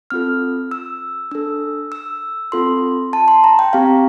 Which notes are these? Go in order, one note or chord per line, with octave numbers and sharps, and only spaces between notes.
C4 F4 A4 F6
E6
D4 A4 E6
E6
C4 F4 A4 C6
A5
C6
A#5
G5
C4 G4 F5